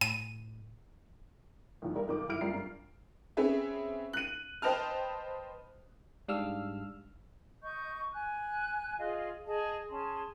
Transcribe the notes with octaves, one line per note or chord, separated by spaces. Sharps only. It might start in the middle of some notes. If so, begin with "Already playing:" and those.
A2 D#7
B1 E2
G3 A#4
B1 D#3 D6
G1 E4 F6 D7
F#2 G3 F4 A#5 C7
G2
C4 C#4 G#4 B4 E5
F#6 D#7
B4 C5 D#5 G5 A5 F6
G#2 G3 D4 F5 E6 F6
D#5 C#6 G6
G#5 F#6
F4 G#4 D#5 F5
G#4 D#5 A5
C#4 G#4 A5 C6